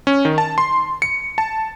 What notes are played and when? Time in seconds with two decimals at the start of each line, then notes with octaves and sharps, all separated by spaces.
0.07 C#4
0.25 D#3
0.38 A5
0.58 C6
1.02 C#7
1.38 A5